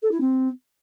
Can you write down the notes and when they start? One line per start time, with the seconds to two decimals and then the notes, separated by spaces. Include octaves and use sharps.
0.02 A4
0.11 E4
0.20 C4